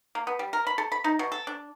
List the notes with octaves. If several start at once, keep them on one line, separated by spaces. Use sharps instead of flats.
A#3
B3
G3
A#4
B5
A4
B5
D#4
B2
A4
D4